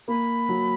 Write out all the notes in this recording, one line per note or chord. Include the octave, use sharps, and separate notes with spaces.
A#3 B5
F#3